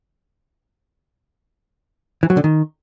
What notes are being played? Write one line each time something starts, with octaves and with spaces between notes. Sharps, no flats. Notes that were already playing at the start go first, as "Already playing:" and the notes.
E3
F#3
D3
D#3